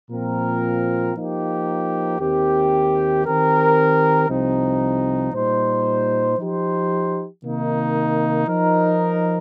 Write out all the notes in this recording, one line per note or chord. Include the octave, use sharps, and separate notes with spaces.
A#2 F3 C4 F4 A#4
F3 A#3 D#4 G4
D#2 D#3 C4 G4
D#3 C4 G4 A#4
C2 C3 F3 C4 D#4
A#2 G3 D#4 C5
F3 D#4 G4 C5
C3 D#3 A#3 D#4
F3 D#4 A#4